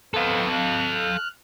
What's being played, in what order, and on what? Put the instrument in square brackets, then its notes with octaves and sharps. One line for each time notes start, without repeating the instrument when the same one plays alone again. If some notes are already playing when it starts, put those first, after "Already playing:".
[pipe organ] B3 C4 [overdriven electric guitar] A4 F5
[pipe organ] F6 F#6